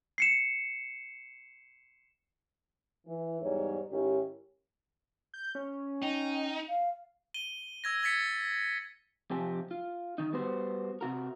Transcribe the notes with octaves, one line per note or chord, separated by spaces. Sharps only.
C7 C#7 E7
E3
E2 G#2 G3 C#5
G#2 D#3 C#4 E4 G4
G6
C#4
D#4 G5
F5
D#7 G7
E6 G#6 A#6
G#6 A6 B6 C#7
F2 C3 F3 G4 G#5
F4
D#3 D#4
G3 B3 F#4 C5
C3 F#4 A#4